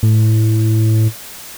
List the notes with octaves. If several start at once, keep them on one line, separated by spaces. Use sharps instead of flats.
A2